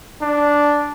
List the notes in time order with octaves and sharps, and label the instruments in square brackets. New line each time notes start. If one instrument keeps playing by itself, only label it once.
[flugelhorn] D4